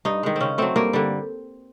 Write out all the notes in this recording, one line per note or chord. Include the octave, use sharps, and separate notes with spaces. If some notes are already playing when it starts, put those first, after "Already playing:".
G2 D#4
D#3 G#3
C#3 C4 C#4
F#3 A3 C4
G2 A#3
D3 G3